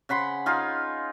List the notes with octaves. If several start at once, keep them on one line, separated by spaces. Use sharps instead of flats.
C#3 F#5 B5 C6
D#4 F4 G#4 F5